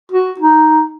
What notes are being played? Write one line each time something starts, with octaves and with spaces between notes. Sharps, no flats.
F#4
D#4